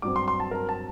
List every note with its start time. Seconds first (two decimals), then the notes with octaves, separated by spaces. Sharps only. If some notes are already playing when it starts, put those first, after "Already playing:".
0.02 G2 F#3 C4 D6
0.16 C6
0.28 C6
0.40 A5
0.51 A#4
0.69 A5